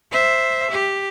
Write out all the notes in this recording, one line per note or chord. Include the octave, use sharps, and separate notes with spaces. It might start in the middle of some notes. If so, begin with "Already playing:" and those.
C5 E5
G4